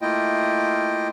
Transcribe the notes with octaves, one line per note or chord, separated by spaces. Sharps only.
A3 A#3 E4 F4 D#5 G5